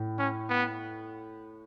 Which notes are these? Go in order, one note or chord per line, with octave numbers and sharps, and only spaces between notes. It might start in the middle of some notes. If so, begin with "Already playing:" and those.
Already playing: A2
C#4
B3